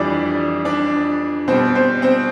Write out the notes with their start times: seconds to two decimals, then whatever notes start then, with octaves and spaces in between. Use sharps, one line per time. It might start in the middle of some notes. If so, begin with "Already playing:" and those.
Already playing: F2 E3 G3 D4 D5
0.65 D4 D5
1.47 B2 G3 C4 C5
1.75 C4 C5
2.02 C4 C5